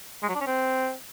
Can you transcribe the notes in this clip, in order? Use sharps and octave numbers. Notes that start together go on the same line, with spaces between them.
G#3
F#3
D4
C#4
C4